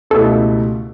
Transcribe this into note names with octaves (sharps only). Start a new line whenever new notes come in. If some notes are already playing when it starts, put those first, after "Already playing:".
C#2 B2 A3 E4 G4 A4